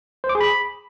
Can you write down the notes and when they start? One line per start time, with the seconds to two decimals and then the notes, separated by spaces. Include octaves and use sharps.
0.24 C5
0.29 D6
0.35 G#4
0.41 B5